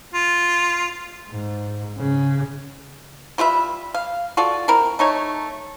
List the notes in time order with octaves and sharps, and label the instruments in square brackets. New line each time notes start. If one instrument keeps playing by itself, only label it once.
[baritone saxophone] F4
[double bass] G#2
C#3
[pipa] G3 F4 B4 E5
F5
F4 F#4 A4 D5
C4 E4 A#4
A3 D#4 C#5